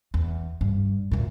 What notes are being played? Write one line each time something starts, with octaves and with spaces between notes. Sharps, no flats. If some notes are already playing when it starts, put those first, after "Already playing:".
E2
G2
D2 A#2